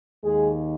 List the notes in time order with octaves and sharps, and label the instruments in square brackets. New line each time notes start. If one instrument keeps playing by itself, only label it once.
[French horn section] D#2 D#3 G#3 G#4